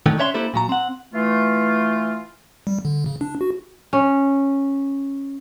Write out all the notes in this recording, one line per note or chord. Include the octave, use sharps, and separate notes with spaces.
D3 D#3 A3
C#4 D4 C#5 E5 G5 C6
A#3 D4 E4 G4 A4 C5
A#2 F#3 A#5
C4 F#5
E3 A3 F4
G3
D3
C#3
D4
F#4
C#4